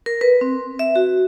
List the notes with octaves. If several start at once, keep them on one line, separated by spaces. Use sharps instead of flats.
A#4
B4
C4
E5
F#4